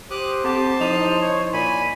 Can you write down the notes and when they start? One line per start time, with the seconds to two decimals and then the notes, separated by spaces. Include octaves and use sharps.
0.11 G4 C5 D6 D#6 F#6
0.44 C4 G4 F#5 A5 D6
0.81 F3 D#4 E4 D#7
1.21 C#5
1.53 A#2 G#5 B5